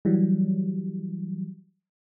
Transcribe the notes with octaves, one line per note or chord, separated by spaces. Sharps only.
E3 F#3 G3